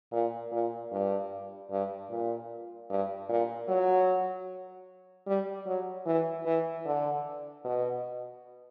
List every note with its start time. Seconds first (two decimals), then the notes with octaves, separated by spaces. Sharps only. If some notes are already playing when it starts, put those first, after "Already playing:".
0.12 A#2
0.52 A#2
0.92 G2
1.71 G2
2.11 A#2
2.90 G2
3.29 A#2
3.68 F#3
5.27 G3
5.66 F#3
6.06 E3
6.46 E3
6.85 D3
7.64 B2